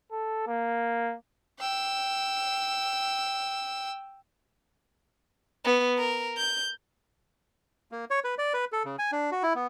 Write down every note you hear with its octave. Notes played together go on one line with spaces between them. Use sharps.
A4
A#3
G5 E6
B3
A#4
G6
A#3
C#5
B4
D5
B4
A4
C#3
G#5
D4
F#4
E4
B3